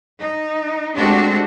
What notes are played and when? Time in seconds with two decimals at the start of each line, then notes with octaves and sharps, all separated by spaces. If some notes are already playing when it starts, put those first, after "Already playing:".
0.20 D#4
0.96 G#3 A3 C4 D4 F#4 G4